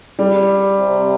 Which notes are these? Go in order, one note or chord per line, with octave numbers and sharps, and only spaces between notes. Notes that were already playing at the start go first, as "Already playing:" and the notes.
G3
C3